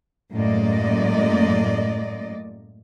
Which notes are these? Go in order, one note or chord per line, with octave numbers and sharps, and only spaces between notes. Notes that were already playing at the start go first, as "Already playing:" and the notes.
F#2 A2 G#3 A#3 D5 D#5